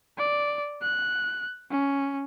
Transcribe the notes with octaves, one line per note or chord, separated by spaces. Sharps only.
D5
F#6
C#4